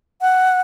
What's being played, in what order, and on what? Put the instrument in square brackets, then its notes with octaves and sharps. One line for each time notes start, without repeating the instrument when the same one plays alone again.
[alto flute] F#5